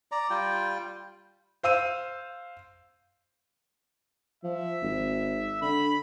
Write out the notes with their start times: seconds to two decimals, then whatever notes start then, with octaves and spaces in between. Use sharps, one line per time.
0.12 D5 A#5
0.30 G3 F4 G5
1.63 C5 F5 E6 D#7
4.44 F3 E5
4.82 G#1
5.62 D3 B5